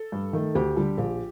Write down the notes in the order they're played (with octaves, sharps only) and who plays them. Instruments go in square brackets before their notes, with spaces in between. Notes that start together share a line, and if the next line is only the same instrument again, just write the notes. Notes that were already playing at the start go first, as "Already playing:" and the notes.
Already playing: [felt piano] A4
G2
D#3 A3
D2 G4
D3 G3
A#1